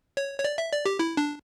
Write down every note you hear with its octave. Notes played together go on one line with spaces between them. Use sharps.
C#5
C#5
D5
E5
D5
G4
E4
D4